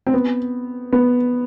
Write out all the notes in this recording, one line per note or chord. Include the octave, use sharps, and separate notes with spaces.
C4
B3
B3